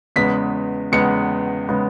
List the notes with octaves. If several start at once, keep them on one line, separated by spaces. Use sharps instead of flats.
E2 C#3 G#3 B3 B6
E2 C#3 G#3 B3 C#7
C#3 G#3 B3